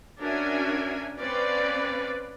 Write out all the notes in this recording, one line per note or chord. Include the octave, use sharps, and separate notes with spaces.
C#4 D4 F#4 A#4 E5 G#5
C4 C#4 B4 D5 F5